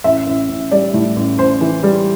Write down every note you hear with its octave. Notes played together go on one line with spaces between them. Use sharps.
A1 E5
A1
A1
G3 D5
A2
A1
A1 C5
E3
G3